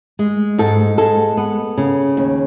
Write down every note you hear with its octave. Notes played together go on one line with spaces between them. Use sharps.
G#3
G#2 A4
G#3 A4
B3
C#3
D#2